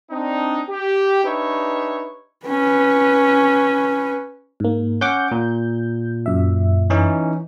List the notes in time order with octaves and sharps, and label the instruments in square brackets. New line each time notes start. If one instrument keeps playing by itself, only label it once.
[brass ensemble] C4 D4 D#4
G4
D4 D#4 G4 B4 C#5 E5
[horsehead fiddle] C#4 B4
[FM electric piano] G#2 A#3
[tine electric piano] C#4 F#5 D6 [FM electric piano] G6
[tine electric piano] A#2
[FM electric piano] F#2 E5
[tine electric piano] E3 C#4 D#4